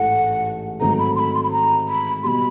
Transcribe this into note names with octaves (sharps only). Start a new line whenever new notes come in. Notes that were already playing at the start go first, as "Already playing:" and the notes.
Already playing: A1 G#2 E3 A3 F#5
G#2 D#3 F#3 A3 C4 A#5
B5
C6
B5
C6
B5
A#5
B5
B2 G3 B5 C6